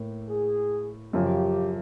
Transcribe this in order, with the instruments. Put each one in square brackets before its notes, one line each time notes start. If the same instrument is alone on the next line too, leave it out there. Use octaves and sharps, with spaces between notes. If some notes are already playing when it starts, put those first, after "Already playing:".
Already playing: [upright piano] A2 A#3
[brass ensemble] G#4
[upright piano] F#2 C#3 F3 [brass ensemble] G4